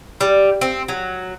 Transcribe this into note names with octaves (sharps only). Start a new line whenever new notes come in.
G3
C4
F#3